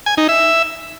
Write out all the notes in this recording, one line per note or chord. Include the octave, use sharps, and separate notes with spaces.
G#5
D#4
E5